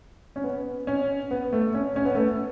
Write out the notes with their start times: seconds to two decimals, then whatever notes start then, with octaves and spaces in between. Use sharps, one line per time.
0.36 C#4
0.44 B3
0.87 C#4
1.31 B3
1.53 A3
1.74 C#4
1.96 C#4
2.05 B3
2.15 A3
2.25 B3